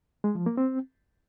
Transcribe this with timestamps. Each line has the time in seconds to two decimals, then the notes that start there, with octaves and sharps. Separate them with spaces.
0.24 G#3
0.35 F3
0.46 A#3
0.57 C4